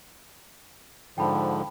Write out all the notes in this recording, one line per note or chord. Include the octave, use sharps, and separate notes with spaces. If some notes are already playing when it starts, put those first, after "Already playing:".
G#2 D3 F3 G5 A5 B5